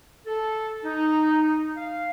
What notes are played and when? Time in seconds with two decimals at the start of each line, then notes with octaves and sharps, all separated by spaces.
0.26 A4
0.84 D#4
1.77 F5